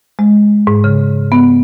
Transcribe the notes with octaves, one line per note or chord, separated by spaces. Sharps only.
G#3
G#2
C#3
B3